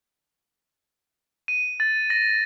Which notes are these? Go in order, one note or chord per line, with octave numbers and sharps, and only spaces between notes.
D#7
A6
A#6